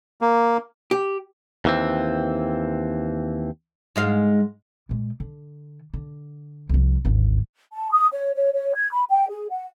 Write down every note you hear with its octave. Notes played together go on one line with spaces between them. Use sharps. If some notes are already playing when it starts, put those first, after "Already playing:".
A#3
G4
D#2 E3 C4
G#2 G#3 F5
A#2 G#3
D3
D3
C2 F3
G#1 D2
A5
D#6
C#5
C#5
C#5
G#6
B5
G5
G#4
F#5